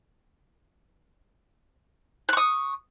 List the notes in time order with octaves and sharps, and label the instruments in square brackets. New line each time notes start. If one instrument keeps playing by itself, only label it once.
[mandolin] F#6
C#6
D#6